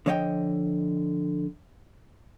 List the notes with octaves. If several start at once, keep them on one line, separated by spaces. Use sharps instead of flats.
D3 F3 C#5 D#5 F5 G5